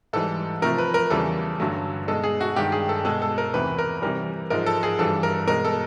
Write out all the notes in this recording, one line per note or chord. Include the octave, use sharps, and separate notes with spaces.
G#2 E3 G3 A4
C3 F3 A3 A#4
B4
A#4
E2 C#3 E3 G3 A4
G2 D3 F#3 A3
B2 G#3 A4
G#4
F#4
G2 D#3 G#3 G4
G#4
A4
B2 G#3 A4
A4
A#4
E2 C3 E3 A3 B4
A#4
C3 E3 G3 A#4
G#2 F3 G#3 A#4
A4
G#4
G2 E3 G3 A4
A#4
B2 G#3 A#4
A4